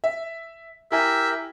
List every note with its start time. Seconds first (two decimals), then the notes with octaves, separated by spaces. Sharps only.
0.04 E5
0.92 E4 G4 A#4 E5 G5 G#5